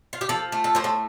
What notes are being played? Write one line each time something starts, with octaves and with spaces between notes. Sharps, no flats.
F4
G4
F3 A4
A3
A4
A2 C5
A4